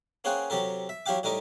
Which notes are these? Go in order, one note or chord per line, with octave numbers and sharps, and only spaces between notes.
A#3 C#4 G#4 C5 F#5 G5
C3 F#3 G4 A4 A#4
E5
F#3 E4 G4 F5 G5 D6
A2 G3 A3 D#4 A#4 D6